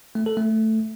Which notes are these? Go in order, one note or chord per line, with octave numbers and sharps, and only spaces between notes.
A3
A4
A3